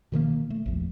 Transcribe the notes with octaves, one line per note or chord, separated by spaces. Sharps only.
B2 D#3 F3 A#3
A3
A#1 E2